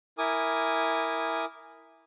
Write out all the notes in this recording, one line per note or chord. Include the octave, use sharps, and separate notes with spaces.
E4 A#4 G#5 D6 D#6